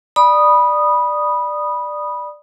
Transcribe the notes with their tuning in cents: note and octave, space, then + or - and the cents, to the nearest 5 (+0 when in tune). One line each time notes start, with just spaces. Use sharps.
D5 +10 B5 -15 D#6 -10